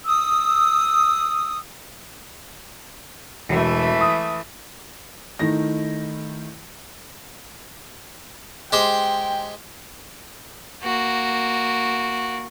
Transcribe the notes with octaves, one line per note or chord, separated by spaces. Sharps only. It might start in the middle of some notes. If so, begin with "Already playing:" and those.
D#6 E6
E1 E3 A3
D#6
D#3 A3 D#4 E4 A#6
G#3 G4 C5 G5
A#3 F#4